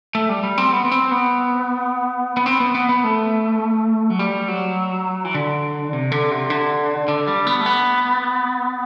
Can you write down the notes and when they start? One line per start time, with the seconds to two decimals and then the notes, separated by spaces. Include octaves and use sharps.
0.15 A3
0.29 G3
0.43 G3
0.58 C4
0.72 B3
0.85 B3
0.91 C4
1.11 B3
2.37 B3
2.46 C4
2.60 B3
2.75 B3
2.89 B3
3.04 A3
4.10 F#3
4.19 G3
4.48 F#3
5.25 E3
5.35 D3
5.93 C3
6.12 D3
6.31 C3
6.50 D3
7.08 D3
7.28 G3
7.47 B3
7.61 A3
7.66 B3